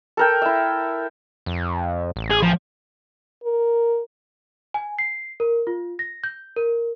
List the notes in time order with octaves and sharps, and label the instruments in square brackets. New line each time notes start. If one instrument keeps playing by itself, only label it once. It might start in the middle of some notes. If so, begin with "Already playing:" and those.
[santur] A4 A#4 G5
E4 E5
[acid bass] F2
A1
[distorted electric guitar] G#4
F3
[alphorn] A#4
[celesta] G#5
C7
A#4
F4
A#6
G6
A#4